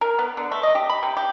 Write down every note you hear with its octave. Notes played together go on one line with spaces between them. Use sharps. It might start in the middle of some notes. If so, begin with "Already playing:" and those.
A#4
B3
D3
A3
D#5
G4
B5
C3
G4